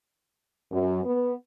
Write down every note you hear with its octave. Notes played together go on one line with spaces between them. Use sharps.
F#2
B3